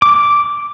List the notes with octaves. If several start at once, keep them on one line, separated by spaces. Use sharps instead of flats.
D6